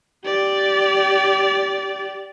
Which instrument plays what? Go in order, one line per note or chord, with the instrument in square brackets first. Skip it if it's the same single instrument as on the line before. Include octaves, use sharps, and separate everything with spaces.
[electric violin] G4 D5